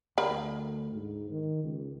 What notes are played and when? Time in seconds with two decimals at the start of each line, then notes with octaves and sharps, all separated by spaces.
0.18 D2 A#4 B5
0.92 G#2
1.30 D#3
1.63 C#2